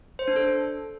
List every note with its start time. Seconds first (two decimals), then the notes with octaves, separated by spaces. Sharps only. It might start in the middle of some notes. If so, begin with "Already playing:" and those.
0.19 C5
0.28 D4
0.36 A4